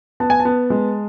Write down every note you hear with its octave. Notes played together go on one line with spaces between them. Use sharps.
B3 A5
G#5
A5
B3
G#3